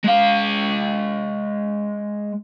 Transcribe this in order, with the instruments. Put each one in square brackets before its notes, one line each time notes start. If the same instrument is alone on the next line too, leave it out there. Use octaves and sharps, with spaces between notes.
[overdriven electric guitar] G#3 F5